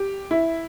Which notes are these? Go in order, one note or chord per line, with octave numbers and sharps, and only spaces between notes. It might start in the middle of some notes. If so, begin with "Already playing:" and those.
Already playing: G4
E4